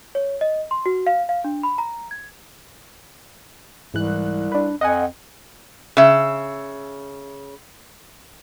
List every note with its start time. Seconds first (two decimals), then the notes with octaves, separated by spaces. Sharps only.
0.15 C#5
0.41 D#5
0.71 C6
0.86 F#4
1.07 F5
1.29 F5
1.44 D4
1.63 B5
1.78 A#5
2.11 G#6
3.94 C2 G#2 E3 F#6
4.52 D4 B4
4.81 F2 D#5 F#5 G#5
5.97 C#3 E5